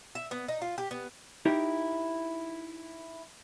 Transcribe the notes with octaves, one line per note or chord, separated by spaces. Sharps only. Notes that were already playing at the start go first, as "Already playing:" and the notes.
E5
B3
D#4
F4
G4
B3
D#4 E4 G4 A#4